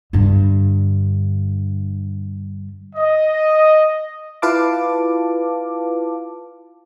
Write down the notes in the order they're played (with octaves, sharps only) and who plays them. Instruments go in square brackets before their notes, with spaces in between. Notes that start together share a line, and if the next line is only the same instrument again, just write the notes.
[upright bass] G2 D3
[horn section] D#5
[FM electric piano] E4 F4 B4 F5 A5 D6